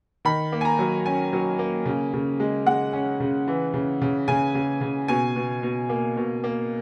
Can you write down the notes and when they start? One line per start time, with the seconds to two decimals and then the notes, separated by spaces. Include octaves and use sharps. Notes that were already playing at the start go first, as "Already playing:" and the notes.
0.25 D#3 B5
0.52 A#3
0.61 G#5
0.65 A#5
0.79 F#3
1.06 C#4 G#5
1.33 F#3
1.59 A#3
1.86 C#3
2.14 C#3
2.40 G#3
2.66 G#3 F#5
2.93 C#4
3.20 C#3
3.48 E3
3.74 C#3
4.02 C#3
4.28 C#3 G#5
4.55 C#3
4.81 C#3
5.08 B2 G#5
5.36 B2
5.63 B2
5.89 A#3
6.17 B2
6.44 A#3